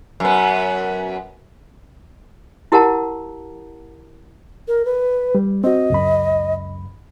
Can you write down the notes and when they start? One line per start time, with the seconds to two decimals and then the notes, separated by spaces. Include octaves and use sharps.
0.20 F#2 B3
2.72 E4 G4 A#4 F#5 A5 A#5
4.68 A#4
4.85 B4
5.35 G3
5.64 C4 F#4 D#5
5.90 C#2 F#2 B5